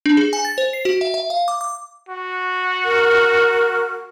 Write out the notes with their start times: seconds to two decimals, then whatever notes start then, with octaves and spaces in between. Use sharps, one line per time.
0.06 D4
0.17 G#4
0.33 G#5
0.45 A6
0.58 C5
0.73 C7
0.85 F#4
1.01 E5
1.14 E5
1.30 F5
1.48 D6
1.61 D6
2.09 F#4
2.85 A#4